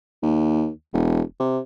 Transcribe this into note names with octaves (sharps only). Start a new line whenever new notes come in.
D#2
E1
C3